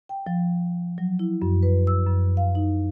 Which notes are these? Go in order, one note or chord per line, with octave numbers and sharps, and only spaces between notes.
G5
F3
F#3
E4
F#2
B4
E6
F#2
F5
D#4